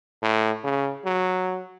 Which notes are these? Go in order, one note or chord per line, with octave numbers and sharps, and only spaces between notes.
A2
C#3
F#3